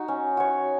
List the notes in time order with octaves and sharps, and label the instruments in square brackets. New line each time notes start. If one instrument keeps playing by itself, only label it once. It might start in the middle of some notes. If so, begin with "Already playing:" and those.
Already playing: [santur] D#4 F#4
C#4
F#4 C#5